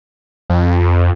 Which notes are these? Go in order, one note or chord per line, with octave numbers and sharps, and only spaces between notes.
F2